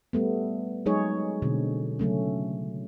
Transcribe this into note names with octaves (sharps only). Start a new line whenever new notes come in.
G3 A3 B3
F#3 G#3 D#4 G#4 C#5
B2 D3 C4
C#3 F#3 A3 C#4